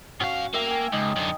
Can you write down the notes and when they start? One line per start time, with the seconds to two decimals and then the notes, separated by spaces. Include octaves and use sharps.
0.20 G#2 C#4 F#4 F5
0.54 A#3 E5 G5
0.67 G5 G#5
0.93 C#2 D#4
1.16 F#2 D3